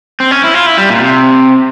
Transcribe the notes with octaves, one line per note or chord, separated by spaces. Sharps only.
C4
C#4
E4
F4
E4
G3
A#2
C3